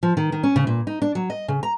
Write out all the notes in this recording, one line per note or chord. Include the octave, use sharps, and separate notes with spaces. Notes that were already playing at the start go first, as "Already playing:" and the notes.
F3
D#3
D#3
C#4
C#3
A#2
D#4
D4
F#3
D#5
C#3
A#5